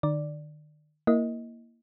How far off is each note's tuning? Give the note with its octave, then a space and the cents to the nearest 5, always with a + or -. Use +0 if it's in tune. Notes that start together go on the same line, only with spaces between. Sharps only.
D#3 -45 D5 +0
A#3 +0 E4 +0 D#5 +15